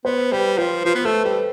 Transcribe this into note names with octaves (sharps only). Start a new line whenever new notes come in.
B3 C5
G3 B4
F3 C5
F3 B4
B3
A3 A4
G3 B4